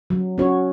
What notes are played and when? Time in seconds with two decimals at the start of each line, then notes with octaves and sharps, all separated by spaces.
0.10 F#3
0.38 C#4 F#4 C#5